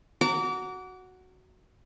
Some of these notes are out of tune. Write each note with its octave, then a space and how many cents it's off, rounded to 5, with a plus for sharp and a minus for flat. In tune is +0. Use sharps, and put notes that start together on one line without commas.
F#4 +0 A#5 -20 D6 -30